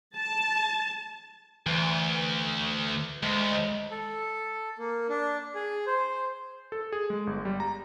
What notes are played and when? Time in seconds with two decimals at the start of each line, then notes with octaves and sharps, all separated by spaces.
0.15 A5
1.66 D2 E3
3.23 D2 G#3
3.91 A4
4.79 A#3
5.09 D4
5.55 G#4
5.87 C5
6.72 A4
6.92 G#4
7.10 G#3
7.27 G1
7.45 G3
7.60 A#5